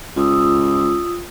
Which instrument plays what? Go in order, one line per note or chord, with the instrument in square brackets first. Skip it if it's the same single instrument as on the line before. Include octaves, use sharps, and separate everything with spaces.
[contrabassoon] C#2 [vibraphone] F4 D#6 E6